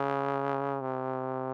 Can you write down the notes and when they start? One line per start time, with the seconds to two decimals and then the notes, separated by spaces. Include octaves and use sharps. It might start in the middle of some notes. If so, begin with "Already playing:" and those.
Already playing: C#3
0.81 C3